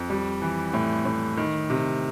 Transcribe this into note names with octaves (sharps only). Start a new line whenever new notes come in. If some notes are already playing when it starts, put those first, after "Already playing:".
Already playing: F2
G3
E3
A2
A2
D#3
C3